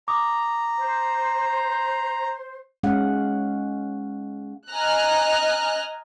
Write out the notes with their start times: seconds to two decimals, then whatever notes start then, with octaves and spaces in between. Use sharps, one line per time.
0.08 A#5 D6 D#6
0.79 C5
2.83 G#3 C#4 F5 F#5
4.70 D#5 G#5 A#5 F6 F#6